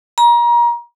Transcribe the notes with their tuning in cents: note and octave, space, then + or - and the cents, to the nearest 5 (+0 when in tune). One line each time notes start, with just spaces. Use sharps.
A#5 +30